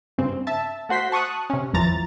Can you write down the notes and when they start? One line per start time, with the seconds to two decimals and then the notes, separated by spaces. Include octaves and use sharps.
0.18 G2 C#3 C4
0.47 E5 A5
0.89 A3 F#4 C5 C6 B6
1.12 A5 C#6 D#6 F#6
1.50 C3 C#4
1.74 G#1 E2 E3 F3 A#5 A6